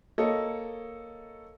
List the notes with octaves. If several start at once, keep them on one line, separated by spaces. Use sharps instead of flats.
A#3 A4 C#5 D#5